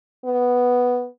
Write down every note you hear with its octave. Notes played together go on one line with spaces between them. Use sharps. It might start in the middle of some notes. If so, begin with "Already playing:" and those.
B3